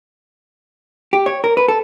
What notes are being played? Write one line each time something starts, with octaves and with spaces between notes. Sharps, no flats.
G4
C#5
A#4
B4
A4